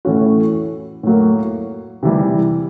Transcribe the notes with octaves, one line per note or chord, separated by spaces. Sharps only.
A2 E3 A3 C#4 F#4
A2 F#3 A#3
C3 E3 G3